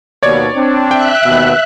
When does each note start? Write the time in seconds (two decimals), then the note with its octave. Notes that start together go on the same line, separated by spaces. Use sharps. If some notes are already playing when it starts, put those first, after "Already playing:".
0.23 D#2 B2 C#5 D5 G#6
0.56 C4 D4
0.91 E5 G5 F#6
1.25 D#2 B2 B3